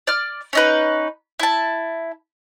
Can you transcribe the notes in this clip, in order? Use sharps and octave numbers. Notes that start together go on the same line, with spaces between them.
D5 F6
C#4 D#4 B4
E4 A5